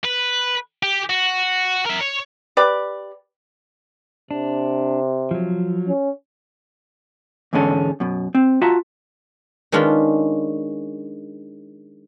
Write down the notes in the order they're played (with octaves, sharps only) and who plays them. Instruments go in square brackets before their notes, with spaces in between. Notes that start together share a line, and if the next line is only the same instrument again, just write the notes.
[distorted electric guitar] B4
G4
F#4
A#4 E5
C#5
[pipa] G4 B4 D5
[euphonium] C3 [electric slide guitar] D4
[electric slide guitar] F3 F#3
[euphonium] C#4
[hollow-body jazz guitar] E2 G#2 D3 G#3 C#4 A4
F#2 B2
C4
F4 F#4 E5 A5 A#5
[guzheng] D#3 G#3 C#4 D4 F4 B4